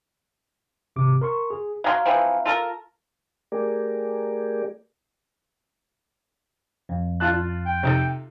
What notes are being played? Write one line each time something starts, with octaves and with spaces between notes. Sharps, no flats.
G#1 C3 D6
A#4 C6 C#6
G#4
F#3 G#4 F5 A#5 C6 F6
E3 F3 C4
F4 A4 A#4
A3 G4 G#4 A#4 D5
F2
F4 A5 F#6
G5
C3 D#4 A4